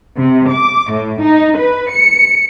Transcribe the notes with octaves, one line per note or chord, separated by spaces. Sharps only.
C3
D6
A2
D#4
B4
C#7